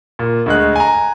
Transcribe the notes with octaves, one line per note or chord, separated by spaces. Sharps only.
A#2
D2 G#3 F#6
G#5 A#5